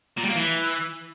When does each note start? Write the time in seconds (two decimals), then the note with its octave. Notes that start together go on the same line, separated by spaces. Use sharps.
0.18 A#2
0.24 G3
0.30 A#3
0.36 E3